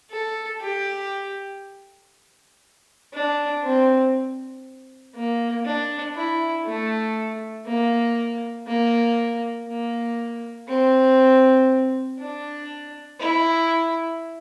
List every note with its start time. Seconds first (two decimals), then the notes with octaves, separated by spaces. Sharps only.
0.11 A4
0.61 G4
3.13 D4
3.64 C4
5.15 A#3
5.65 D4
6.16 E4
6.66 A3
7.67 A#3
8.67 A#3
9.68 A#3
10.68 C4
12.19 D4
13.20 E4